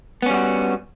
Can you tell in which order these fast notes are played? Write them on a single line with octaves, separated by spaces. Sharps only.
B3 C#4 G3 F#4